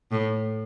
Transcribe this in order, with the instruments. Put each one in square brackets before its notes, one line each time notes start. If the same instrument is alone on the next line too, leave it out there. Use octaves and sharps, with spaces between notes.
[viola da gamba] A2